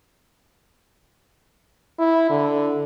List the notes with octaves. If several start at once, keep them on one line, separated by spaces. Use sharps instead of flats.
E4
D3